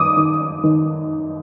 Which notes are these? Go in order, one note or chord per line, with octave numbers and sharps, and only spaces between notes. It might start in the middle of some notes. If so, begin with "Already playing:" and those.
Already playing: D#3 D6 D#6
D#3
D#3